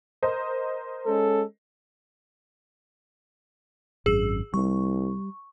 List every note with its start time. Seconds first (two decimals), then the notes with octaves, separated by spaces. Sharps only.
0.22 A#4 C5 D#5
1.07 G#3 C#4 A4
4.06 G#1 F#2 G#4 E6
4.54 C2 G3 C#6